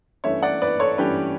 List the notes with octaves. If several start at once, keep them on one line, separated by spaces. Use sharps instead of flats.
G2 E3 A3 C#4 C#5 E5
D5 F#5
B4 D5
A4 C#5
G2 E3 A3 C#4 G4 B4